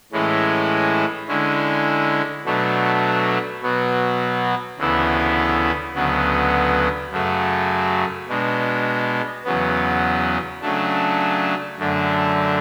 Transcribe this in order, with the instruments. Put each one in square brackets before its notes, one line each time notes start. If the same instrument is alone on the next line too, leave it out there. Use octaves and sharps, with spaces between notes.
[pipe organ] A2 E3 G#3 C#4 E4
D3 G#3 C#4 E4
B2 F#3 A3 D4
B2 F#3 B3
D2 C#3 E3 B3 E4
D2 C#3 F#3 B3
F#2 C#3 F#3 A3
B2 G#3 D4
E2 C#3 F#3 B3
C#3 F#3 A3 D4
F#2 D3 A3 D4